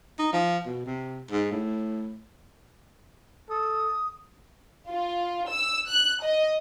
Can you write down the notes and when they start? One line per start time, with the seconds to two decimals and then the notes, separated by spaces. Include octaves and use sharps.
0.19 D#4
0.33 F3
0.66 B2
0.86 C3
1.31 G#2
1.52 A2
3.50 A4 D#6
4.90 F4
5.50 E6
5.88 F#6
6.23 D#5